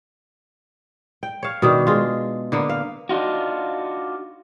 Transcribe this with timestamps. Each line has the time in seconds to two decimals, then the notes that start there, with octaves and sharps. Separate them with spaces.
1.23 G5
1.43 C#5 F5
1.62 B2 D#3 D4
1.87 G#3 F4
2.52 D3 A#3 B3
2.69 F5
3.09 D4 D#4 F4 F#4